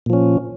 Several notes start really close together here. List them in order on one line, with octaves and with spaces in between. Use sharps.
A#2 F3 C#4